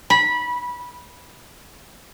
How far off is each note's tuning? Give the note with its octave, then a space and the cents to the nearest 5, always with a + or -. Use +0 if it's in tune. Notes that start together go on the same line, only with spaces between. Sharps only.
B5 -20